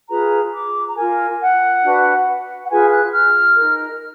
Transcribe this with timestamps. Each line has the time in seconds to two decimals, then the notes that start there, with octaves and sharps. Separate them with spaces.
0.08 F4 G#4 B4 A#5
0.53 D6
0.88 A#5
0.95 F4 A#4 G#5
1.40 F#5
1.82 D4 F#4 B4
2.64 F#5
2.69 F4 G#4 B4 G#5
2.91 F#6
3.12 F6
3.56 D#4 A#4